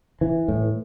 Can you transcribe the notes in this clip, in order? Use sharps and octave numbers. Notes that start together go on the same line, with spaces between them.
E3
A2